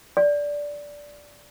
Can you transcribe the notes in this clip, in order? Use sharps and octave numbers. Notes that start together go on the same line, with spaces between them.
D5